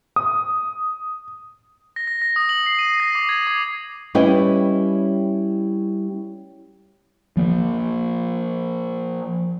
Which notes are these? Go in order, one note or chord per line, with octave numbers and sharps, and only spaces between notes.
D#6
A#6
A#6
A#6
D#6
F#7
C7
D#7
A#6
D6
G#6
D6
G3 C#4 E4 B4 D#5 G5
F3 A#3